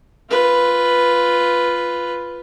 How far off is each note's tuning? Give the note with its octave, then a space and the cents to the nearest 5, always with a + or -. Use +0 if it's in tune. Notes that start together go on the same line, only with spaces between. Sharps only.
F4 +0 B4 +0